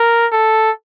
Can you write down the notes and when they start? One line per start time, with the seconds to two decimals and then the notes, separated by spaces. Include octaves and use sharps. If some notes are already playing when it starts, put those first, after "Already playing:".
Already playing: A#4
0.32 A4